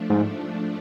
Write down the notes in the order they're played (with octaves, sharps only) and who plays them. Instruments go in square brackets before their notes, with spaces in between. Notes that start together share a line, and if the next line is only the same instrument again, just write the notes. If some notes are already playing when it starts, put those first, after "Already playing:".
Already playing: [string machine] F3 A3 D4
[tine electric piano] G#2